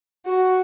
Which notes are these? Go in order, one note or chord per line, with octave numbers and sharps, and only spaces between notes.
F#4